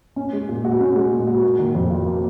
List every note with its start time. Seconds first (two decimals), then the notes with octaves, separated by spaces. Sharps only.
0.16 C#4
0.33 G#3
0.49 A#2
0.65 F#4
0.80 C#4
0.96 G#3
1.12 A#2
1.27 F#4
1.43 A#3
1.59 D#3
1.75 F2
1.90 F4
2.06 A#3